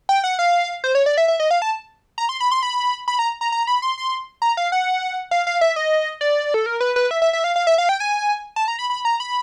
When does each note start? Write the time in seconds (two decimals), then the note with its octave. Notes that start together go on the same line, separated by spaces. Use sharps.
0.09 G5
0.24 F#5
0.39 F5
0.84 C5
0.95 C#5
1.06 D5
1.18 E5
1.28 E5
1.40 D#5
1.51 F5
1.62 A5
2.18 A#5
2.29 C6
2.40 B5
2.52 C6
2.63 B5
3.08 B5
3.19 A#5
3.41 A#5
3.52 A#5
3.67 B5
3.82 C6
3.98 C6
4.42 A#5
4.57 F5
4.72 F#5
5.31 F5
5.47 F5
5.61 E5
5.76 D#5
6.21 D5
6.54 A4
6.66 A#4
6.80 B4
6.96 B4
7.11 E5
7.22 E5
7.33 E5
7.44 F5
7.56 F5
7.67 E5
7.78 F5
7.89 G5
8.00 G#5
8.56 A5
8.68 A#5
8.79 B5
8.90 B5
9.05 A#5
9.20 B5